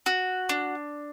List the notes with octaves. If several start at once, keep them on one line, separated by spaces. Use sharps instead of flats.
F#4
D4